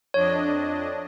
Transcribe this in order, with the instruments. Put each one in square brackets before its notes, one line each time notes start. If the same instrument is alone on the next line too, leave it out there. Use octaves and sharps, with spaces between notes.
[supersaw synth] F2 D4 D#5 [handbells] C#5